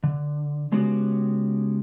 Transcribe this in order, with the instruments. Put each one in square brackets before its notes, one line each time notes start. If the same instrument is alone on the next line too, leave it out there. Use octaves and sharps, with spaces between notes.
[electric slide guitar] D3
C#3 G#3 B3 C#4 F#4 G4